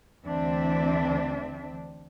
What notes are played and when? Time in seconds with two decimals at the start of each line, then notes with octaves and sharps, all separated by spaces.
0.24 D2 D3 E3 C4 D4 E5